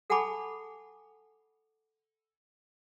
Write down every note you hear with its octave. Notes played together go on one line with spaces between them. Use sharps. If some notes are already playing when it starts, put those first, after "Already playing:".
A4 F#5 G#5 A5 B5 D6